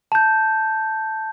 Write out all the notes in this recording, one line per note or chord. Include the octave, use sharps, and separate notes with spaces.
A5 G6